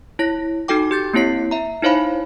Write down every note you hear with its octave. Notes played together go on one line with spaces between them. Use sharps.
E4 C#5 A#6
D#4 F#4 A4 G5 D6
G4 G6 A6
A#3 C4 E4 C#5 C7
E5 A#5
D#4 E4 C5 C#5 F5 B5